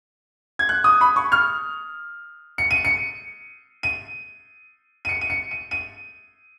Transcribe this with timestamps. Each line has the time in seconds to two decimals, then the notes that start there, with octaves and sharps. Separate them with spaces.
0.59 G#6
0.69 F#6
0.84 D#6
1.01 B5
1.16 C#6
1.32 F6
2.58 C#7
2.71 D#7
2.85 C#7
3.83 D#7
5.05 D#7
5.09 C#7
5.21 D#7
5.30 C#7
5.51 D#7
5.71 D#7